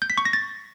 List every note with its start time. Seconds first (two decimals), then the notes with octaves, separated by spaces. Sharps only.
0.02 G6
0.10 B6
0.18 C#6
0.25 A#6
0.33 A6